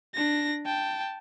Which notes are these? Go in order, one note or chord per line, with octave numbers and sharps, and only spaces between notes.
D4 A#6
G5 A5